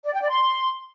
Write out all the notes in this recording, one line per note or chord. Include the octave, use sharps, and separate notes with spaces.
D5
G5
D5
C6